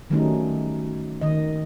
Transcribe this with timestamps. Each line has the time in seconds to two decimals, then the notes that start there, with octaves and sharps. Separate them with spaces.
0.10 D#3 F#3 G3 A3 C#4 D#4
1.21 D#3 D#5